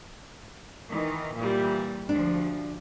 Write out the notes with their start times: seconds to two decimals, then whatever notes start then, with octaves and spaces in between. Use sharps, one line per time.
0.91 D#3 E3
1.36 A#2 E3 G3
2.09 D2 F3 D4